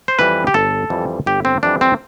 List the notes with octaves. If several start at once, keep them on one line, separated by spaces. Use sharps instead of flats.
C5
F2 E3 G3 B4
G4
G1 A4
F2 E3 G3
G1 G4
C4
F2 E3 G3 D4
C4